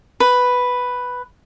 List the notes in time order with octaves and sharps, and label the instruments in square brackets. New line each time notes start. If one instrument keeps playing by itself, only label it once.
[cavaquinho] B4